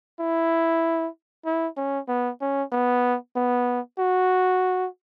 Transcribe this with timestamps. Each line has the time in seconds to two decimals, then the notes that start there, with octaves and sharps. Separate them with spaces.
0.20 E4
1.45 E4
1.77 C#4
2.08 B3
2.41 C#4
2.72 B3
3.36 B3
3.99 F#4